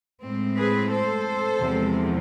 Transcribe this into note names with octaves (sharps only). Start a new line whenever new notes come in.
A2 G#3 C4
G#4 B4
A4 C5
E2 C3 F3 G#3